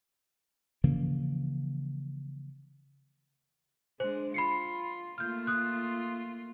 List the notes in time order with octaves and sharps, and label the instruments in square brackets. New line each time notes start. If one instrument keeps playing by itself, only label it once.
[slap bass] C#3 E3 F3 A#3
[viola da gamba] G#3 D4 [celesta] C5
[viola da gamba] F4 [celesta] B5 C7 C#7
[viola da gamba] A3 A#3 F4 [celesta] F6 G6
[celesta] D#6 F#6